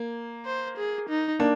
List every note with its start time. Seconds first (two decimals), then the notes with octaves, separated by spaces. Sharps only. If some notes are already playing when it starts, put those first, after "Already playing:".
Already playing: A#3
0.45 C5
0.77 G#4
1.09 D#4
1.39 A#3 D4